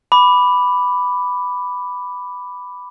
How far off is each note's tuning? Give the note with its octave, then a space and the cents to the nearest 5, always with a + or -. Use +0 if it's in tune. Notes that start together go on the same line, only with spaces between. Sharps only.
B5 +5 D6 +0